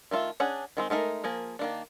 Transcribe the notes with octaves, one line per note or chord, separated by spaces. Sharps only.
D#3 A3 F4 E5
C#4 D4 G#4 F#5
D#3 G#3 C4
G#3 A3 D#4 A#4
F3 A#3 G#4 A#4
D#3 A#3 D4